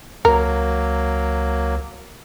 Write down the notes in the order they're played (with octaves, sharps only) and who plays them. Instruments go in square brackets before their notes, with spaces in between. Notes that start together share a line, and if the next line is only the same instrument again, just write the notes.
[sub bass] C#2 [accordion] F#3 A#3 [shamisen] A#4